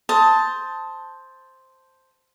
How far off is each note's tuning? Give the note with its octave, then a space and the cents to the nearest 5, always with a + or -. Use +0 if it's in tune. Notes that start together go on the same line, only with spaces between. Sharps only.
C5 +0 A5 +0 D#6 +20